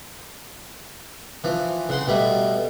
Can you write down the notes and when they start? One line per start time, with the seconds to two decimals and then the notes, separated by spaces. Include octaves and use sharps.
1.44 E3 F3
1.89 C#3 F#5 C6
2.07 B2 G3 A3